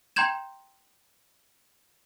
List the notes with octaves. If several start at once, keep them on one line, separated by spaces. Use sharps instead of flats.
G5 A#5 C6 G6 G#6 E7